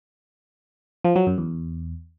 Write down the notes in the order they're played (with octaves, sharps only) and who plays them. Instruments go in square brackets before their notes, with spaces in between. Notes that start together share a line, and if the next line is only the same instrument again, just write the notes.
[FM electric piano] F3
F#3
F#2
E2